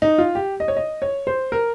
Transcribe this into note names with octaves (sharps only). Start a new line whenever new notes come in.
D#4
F4
G4
D#5
C#5
D#5
C#5
C5
A#4